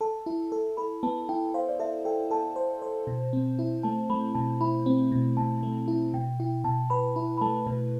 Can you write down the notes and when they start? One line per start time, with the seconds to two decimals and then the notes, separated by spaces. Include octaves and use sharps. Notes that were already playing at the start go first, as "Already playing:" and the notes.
0.01 A4 A5
0.26 E4
0.52 A4
0.77 A4 B5
1.03 B3 A5
1.29 E4 G5
1.54 C5 F5
1.69 D5
1.79 A4 E5
2.05 A4 G5
2.31 A4 A5
2.56 C5
2.82 C5
3.07 B2
3.33 C4
3.59 E4
3.83 A3 A5
4.10 A3 B5
4.35 B2 A5
4.61 E4 B5
4.86 C4
5.12 B2
5.37 B2 A5
5.63 A3
5.88 E4
6.14 B2 G5
6.40 E4 G5
6.64 B2 A5
6.90 B4 B5
7.16 E4 B5
7.38 B5
7.41 A3 A5
7.66 B2 B4